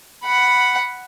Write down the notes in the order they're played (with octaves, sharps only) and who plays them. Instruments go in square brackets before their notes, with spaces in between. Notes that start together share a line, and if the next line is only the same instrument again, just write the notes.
[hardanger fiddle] F#5 B5